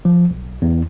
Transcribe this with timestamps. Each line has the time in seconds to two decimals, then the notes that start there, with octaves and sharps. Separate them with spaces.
0.05 F3
0.31 B1
0.62 E2